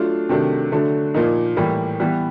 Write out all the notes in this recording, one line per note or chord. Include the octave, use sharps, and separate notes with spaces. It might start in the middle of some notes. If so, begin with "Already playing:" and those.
Already playing: F#3 A3 D4 F4
C3 D#3 F#3 A3 D4
D3 F#3 A3 D4
A#2 F3 A#3 D#4
A2 E3 G3 A#3
E3 G3 B3